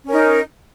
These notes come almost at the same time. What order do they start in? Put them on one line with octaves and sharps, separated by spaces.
C#4 A#4 D#4